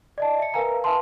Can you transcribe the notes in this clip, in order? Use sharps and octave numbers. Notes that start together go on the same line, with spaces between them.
D5 D#5 A5
E5 C#7
A#4 B4 F5 G#5 A#5
B4 E5 F5 G#5 A5 C6